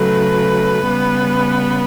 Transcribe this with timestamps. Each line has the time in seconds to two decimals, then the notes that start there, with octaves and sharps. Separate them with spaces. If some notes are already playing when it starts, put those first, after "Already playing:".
Already playing: C#3 F#3 A3 B4
0.87 C#3 G3 B3